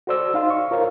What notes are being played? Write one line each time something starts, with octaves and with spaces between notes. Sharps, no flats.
F#4 A4 C5 D5 E6
D#4 F5 C6
C#6
F4 A#4 C5 C#5 F5